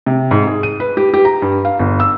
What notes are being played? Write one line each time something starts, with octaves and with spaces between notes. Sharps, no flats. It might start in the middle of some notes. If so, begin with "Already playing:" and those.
C3
G#2
G#4
D#7
B4
G4
G4
A#5
G2
F5
G1
E6